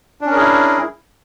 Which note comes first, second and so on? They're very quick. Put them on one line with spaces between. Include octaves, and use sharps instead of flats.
D4 C#4 A#4 G#4 E4